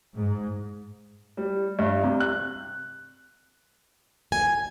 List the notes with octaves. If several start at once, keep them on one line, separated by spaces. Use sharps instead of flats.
G#2
G3
G2
C3
F#6
G#5